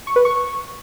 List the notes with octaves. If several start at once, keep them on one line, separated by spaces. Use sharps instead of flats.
C#6
B4
C#6